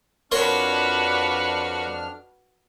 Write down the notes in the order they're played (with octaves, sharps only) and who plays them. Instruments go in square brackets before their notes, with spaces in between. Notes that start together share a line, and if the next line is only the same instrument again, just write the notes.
[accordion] F2 D4 F6 [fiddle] F#4 B4 [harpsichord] A#4 C#5 C6